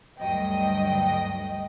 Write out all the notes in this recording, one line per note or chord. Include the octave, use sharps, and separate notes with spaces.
D2 G2 F#3 D#5 G5